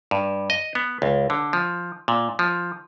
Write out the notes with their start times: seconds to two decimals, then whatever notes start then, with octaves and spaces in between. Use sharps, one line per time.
0.11 G2
0.50 D#5
0.75 B3
1.02 C#2
1.30 D3
1.53 F3
2.08 A#2
2.39 F3